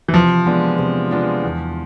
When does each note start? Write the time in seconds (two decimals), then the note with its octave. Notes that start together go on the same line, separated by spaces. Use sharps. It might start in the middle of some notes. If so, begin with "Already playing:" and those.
0.08 E3
0.14 C3 F3
0.46 G#3 B3 D4 F4
0.79 C3
1.11 G#3 B3 D4 F4
1.43 E2